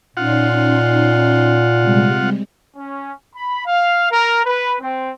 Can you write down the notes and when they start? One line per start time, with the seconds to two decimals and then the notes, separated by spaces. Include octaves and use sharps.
0.17 A#2 C#4 D#4 F4 F#5 C6
1.81 C3 G3 G#3
2.76 C#4
3.35 B5
3.66 F5
4.12 A#4
4.45 B4
4.81 C4